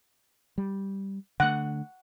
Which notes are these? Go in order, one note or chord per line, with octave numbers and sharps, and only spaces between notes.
G3
D3 A3 F#5